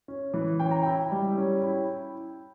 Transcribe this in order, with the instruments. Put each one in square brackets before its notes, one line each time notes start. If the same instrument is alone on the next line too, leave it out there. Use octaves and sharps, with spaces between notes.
[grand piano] C#4
E3
C#4 G5
A#5
E4 G5
G3
C#4
E4